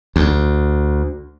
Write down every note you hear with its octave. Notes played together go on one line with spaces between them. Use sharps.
D2